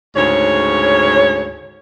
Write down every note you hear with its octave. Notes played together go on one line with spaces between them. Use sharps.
D2 G#2 C#3 C#5